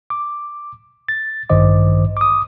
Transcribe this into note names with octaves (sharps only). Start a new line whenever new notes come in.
D6
A6
A1 G2 D#3 C5 D#5 D6
D6 D#6